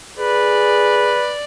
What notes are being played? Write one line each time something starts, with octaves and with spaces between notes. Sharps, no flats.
G#4 B4 D5